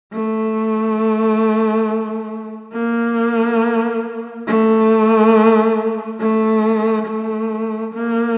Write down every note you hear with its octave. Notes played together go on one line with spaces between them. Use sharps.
A3
A#3
A3
A3
A3
A#3